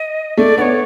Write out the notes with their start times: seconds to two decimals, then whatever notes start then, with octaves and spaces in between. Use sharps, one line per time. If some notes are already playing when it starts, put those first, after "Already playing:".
Already playing: D#5
0.37 A3 D5
0.58 B3 D5
0.62 C#5